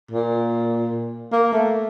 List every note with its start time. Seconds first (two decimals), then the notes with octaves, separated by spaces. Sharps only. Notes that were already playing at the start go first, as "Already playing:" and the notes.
0.11 A#2
1.32 A#3
1.53 A3